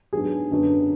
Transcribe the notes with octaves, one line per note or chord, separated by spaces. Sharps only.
G#2 F#3 B3 D4 G#4
F#2 D3 F#3 B3 D4